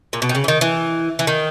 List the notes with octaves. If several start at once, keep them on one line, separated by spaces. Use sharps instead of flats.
A#2
B2
D#3
C#3
E3
D#3
E3
E3
D#3